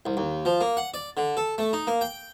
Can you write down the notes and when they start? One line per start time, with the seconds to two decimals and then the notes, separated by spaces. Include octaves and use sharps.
0.06 C2
0.17 D#2
0.45 F3
0.61 A#3
0.77 F#5
0.94 D5
1.17 D3
1.37 A4
1.58 A3
1.73 D#4
1.87 A#3
2.01 G5